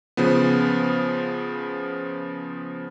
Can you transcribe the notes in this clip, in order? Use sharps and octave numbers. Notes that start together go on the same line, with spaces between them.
C#3 F3 B3